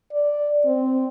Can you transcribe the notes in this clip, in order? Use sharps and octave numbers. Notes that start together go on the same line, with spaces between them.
D5
C4